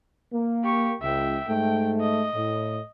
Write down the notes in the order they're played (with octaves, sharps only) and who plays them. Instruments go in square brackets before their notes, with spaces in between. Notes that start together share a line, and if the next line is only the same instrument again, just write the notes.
[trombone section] A#3
[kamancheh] G4 C#6
[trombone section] C#2 [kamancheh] E5 G5
[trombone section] G#2 A3 [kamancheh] G5
[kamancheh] D#5
[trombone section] A2